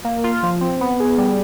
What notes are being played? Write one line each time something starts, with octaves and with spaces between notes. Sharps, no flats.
A#3
F4
F3
C4
B3
G#4
G3